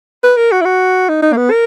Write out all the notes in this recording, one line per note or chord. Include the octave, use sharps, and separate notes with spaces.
B4
A#4
F#4
E4
F#4
D#4
D#4
A#3
B3
A#4